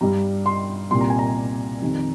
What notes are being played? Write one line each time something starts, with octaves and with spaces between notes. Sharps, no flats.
G2 G3 A#5
C6
C2 A#2 G3 C6
A#5
G#5
A#5
F2 D#3 G3